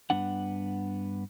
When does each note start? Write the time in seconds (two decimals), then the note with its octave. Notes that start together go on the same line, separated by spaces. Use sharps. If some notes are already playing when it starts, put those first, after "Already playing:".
0.10 G2 B3 D4 F#5